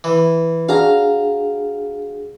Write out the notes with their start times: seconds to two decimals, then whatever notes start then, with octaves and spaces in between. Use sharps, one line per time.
0.04 E3
0.69 D4 F#4 G#4 F5 A#5